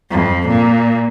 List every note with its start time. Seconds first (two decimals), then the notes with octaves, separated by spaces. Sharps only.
0.10 F2
0.48 A#2